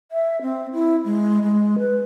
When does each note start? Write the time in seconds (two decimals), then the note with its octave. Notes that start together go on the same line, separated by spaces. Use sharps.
0.12 E5
0.42 C4
0.73 E4
1.05 G#3
1.43 G#3
1.79 B4